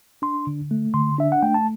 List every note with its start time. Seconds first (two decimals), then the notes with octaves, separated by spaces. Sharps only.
0.22 D4 C6
0.47 D3
0.71 A3
0.94 D3 C6
1.18 D4 E5
1.32 F#5
1.42 A3 G5
1.54 A5